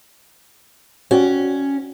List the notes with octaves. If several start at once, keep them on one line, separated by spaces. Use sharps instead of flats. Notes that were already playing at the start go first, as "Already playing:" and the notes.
C#4 F#4 D5 G5